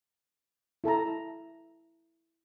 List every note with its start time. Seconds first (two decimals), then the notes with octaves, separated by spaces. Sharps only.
0.84 E4 A4 A5 A#5